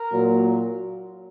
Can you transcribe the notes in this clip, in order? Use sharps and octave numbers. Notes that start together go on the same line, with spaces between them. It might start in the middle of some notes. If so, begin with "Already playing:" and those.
Already playing: A#4
A#2 F#3 A#3